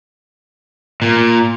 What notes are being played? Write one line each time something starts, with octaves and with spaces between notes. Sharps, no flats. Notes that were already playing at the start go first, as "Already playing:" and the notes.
A#2